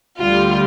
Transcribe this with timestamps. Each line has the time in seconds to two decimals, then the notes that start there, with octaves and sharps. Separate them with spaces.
0.20 D2 D3 G3 F4